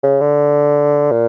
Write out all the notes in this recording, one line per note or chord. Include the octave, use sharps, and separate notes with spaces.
C#3
D3
A#2